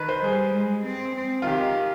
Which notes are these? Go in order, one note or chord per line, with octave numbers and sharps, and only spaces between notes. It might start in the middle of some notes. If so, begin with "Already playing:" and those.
Already playing: D#3 B4
C5
G3 G#4
G#3
C4
C4
F4
D#3 G4